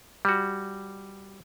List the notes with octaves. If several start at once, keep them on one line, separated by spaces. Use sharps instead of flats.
G3 F#4